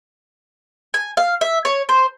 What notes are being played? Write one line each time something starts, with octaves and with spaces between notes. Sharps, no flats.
G#5
F5
E5
C#5
C5